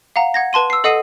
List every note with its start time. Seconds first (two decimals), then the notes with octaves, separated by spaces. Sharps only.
0.16 F5 F#5 A#5
0.34 F#5 G#6 A#6
0.53 B4 A5 C6 D#7
0.70 E6 C7
0.84 A4 D#5 F#5 D#6 C7 D#7